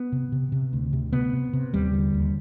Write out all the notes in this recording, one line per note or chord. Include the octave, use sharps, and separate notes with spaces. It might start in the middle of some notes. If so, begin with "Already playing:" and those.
Already playing: B3
C3
C3
C3
D2
C3
C3 B3
C3
C3
D#2 G3
D3
D#2